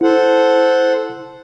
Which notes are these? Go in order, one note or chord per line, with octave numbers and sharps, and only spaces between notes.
E4 A4 C5 F#5